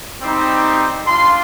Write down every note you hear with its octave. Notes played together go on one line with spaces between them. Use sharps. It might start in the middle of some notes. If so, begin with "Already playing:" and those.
G3 C4 D#4 G4
G3 D4 F4 C6